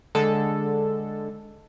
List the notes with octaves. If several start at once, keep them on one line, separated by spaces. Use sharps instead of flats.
D3 G#3 A4